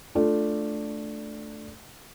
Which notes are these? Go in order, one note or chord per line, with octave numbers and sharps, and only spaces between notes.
A3 D4 F4